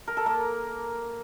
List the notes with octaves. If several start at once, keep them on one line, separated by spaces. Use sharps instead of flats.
A#4
A4
A#3